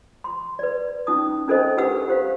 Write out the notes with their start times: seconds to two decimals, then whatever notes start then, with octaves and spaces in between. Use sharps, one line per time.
0.24 C6
0.59 B4 D5
1.07 C#4 D#4 D#6
1.48 C#4 D4 A4 A#4 C5 D#5
1.77 G4 A4 B4 F#5 E6
2.08 G4 C5 F5